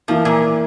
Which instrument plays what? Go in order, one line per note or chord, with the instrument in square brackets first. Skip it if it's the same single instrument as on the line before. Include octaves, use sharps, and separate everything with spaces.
[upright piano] E3 A#3 E4 [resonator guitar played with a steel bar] F3
[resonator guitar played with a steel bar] A#2